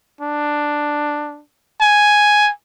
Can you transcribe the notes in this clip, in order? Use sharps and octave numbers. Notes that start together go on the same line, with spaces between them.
D4
G#5